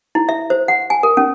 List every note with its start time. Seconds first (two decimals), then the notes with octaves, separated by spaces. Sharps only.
0.15 E4
0.29 E5
0.50 C5
0.68 F#5
0.90 G#5
1.03 A#4
1.17 C#4